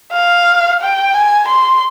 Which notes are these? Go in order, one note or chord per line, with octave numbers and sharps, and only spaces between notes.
F5
G5
G#5
C6